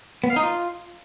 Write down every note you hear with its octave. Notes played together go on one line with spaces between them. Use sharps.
B3
F5
D#4
F4